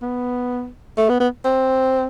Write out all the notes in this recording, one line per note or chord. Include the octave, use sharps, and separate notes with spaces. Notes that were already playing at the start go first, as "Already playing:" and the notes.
B3
A3
B3
B3
C4